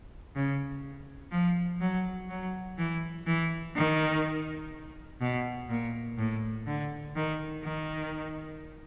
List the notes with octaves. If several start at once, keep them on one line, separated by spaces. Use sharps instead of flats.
C#3
F3
F#3
F#3
E3
E3
D#3
B2
A#2
A2
D3
D#3
D#3